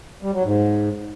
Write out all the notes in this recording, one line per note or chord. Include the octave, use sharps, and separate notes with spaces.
G3
F#3
G#2